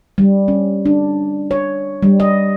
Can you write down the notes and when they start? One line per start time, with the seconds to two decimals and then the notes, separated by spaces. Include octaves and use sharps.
0.18 G3
0.48 C#4
0.86 D4
1.51 C#5
2.03 G3
2.20 D#5